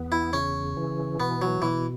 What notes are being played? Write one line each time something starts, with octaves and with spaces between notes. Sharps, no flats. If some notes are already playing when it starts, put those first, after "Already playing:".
Already playing: E2 B3
E4
C#3 C#4
E3
B2 B3
F#3
B2 E3